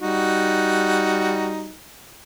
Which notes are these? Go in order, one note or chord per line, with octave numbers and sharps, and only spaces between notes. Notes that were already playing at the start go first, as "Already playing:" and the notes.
G3 D#4 F#4